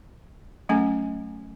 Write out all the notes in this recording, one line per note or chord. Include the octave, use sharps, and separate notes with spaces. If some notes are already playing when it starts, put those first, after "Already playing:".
F#3 A3 C#4 G#5